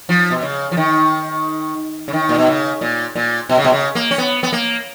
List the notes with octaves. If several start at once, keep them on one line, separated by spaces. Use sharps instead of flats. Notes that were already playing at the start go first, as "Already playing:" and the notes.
F3
B2
C#3
F3
D#3
C#3
D#3
A#2
B2
C#3
A#2
A#2
B2
C#3
B2
C#3
A#3
C#4
B3
B3
A#3